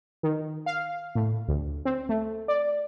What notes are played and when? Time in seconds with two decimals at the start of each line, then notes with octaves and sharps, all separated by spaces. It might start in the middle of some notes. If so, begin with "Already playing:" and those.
0.23 D#3
0.66 F5
1.15 A2
1.48 D2
1.85 C4
2.09 A3
2.48 D5